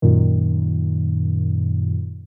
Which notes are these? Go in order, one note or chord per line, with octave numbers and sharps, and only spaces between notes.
F#2 A#2 D#3